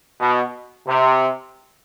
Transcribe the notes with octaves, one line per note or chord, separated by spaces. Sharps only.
B2
C3